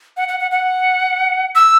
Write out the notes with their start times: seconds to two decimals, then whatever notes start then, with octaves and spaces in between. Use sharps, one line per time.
0.17 F#5
0.28 F#5
0.40 F#5
0.51 F#5
1.55 E6